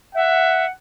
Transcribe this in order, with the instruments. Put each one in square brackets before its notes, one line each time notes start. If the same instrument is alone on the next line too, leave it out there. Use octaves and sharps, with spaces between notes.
[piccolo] E5 [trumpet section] F#5